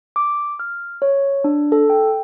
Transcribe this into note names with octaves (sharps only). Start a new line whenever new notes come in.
D6
F6
C#5
D4
A4
G5